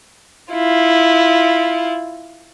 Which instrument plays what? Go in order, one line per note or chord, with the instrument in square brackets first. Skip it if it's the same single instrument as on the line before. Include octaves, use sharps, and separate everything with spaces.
[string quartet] E4 F4